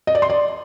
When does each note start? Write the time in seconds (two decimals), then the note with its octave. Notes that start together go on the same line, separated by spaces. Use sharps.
0.07 D#5
0.15 D5
0.22 C6
0.30 D5